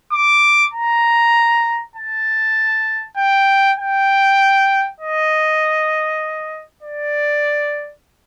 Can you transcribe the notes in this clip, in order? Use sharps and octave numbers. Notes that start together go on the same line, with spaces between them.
D6
A#5
A5
G5
G5
D#5
D5